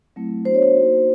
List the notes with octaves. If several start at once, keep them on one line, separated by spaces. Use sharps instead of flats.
F#3 A3 C4 E4
B3 D4 F#4 C5
C#5
C5
A#3 D#4 F#4